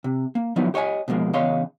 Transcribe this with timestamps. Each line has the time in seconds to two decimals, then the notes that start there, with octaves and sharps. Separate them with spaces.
0.04 C3
0.35 A#3
0.56 D#3 F3 F#3 B3 D#4 E4
0.74 G4 C#5 D#5 E5 G#5
1.08 B2 F3 G#3 A#3
1.33 E2 C#3 C#5 D#5 F5 C6